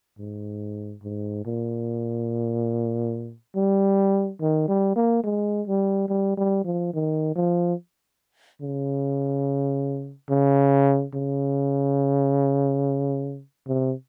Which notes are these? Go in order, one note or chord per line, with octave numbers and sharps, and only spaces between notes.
G#2
G#2
A#2
G3
D#3
G3
A#3
G#3
G3
G3
G3
F3
D#3
F3
C#3
C#3
C#3
C3